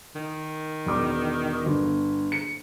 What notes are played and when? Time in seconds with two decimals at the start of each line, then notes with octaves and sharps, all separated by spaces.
0.15 D#3
0.86 E1 D6
1.66 G1
2.32 C#7